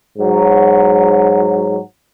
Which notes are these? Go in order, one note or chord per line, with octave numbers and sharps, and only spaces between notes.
G#2 F#3